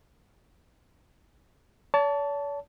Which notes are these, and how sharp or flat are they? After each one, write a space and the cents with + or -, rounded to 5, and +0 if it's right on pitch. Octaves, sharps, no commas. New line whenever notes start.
C#5 +45 A5 +0